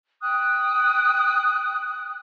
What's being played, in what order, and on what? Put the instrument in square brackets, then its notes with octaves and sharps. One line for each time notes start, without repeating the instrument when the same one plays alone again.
[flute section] G5 D#6 F#6